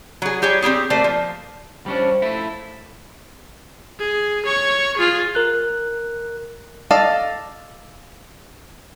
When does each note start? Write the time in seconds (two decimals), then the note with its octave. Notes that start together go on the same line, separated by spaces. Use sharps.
0.22 F#3 G#4
0.42 G3 G4 G#4 C#5
0.62 C4 E4 G4 G#4
0.90 A3 A#3 C5 D5
1.04 F3
1.86 F3 G3 C#4 D4
2.22 A3 E4
3.99 G#4
4.45 C#5 C#6
4.97 F4 G#4
5.35 A#4 F#6
6.91 A4 D5 D#5 F5 A5